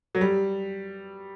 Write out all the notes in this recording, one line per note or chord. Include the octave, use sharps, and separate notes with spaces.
F#3
G3